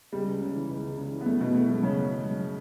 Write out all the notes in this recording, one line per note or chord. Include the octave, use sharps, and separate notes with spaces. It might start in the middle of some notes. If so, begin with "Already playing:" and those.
C#2 G3
C#2
C#3
E3
C#2
C#2
C#3
E3
B3
F#2 A3
B2 E3 B3
E3 A3
F#2 A3
F#2 C#3 C#4
E3
E3
F#2